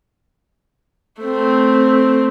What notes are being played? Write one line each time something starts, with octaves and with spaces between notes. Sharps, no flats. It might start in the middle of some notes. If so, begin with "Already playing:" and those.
A3 C4